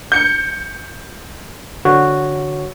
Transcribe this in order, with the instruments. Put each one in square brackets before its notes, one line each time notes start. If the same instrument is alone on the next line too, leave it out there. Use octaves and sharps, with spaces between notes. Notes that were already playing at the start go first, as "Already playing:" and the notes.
[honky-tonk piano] G6 C#7
[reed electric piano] D3 F#4 C#5